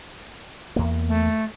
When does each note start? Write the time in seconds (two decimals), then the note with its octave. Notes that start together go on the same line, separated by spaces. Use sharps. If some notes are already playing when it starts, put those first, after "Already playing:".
0.76 E2 A#3
1.08 A3